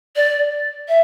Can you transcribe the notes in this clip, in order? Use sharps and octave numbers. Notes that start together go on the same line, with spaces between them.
D5
E5